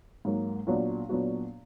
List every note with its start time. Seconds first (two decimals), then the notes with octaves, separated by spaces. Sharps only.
0.25 G#2 F#3 A#3
0.67 A#2 F#3 B3 D4 F#4
1.09 A#2 F#3 B3 D4 F#4